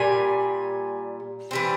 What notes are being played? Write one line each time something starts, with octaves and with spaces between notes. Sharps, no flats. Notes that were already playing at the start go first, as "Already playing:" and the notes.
Already playing: A#2 G3 G#5
E3 G3 C4